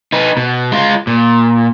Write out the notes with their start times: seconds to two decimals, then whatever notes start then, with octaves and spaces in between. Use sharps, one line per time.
0.12 D#4 B4
0.37 B2
0.72 G#3 F4
1.07 A#2